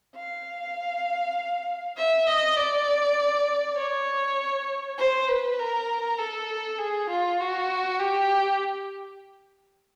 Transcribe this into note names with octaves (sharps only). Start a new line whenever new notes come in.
F5
E5
D#5
D5
C#5
C5
B4
A#4
A4
G#4
F4
F#4
G4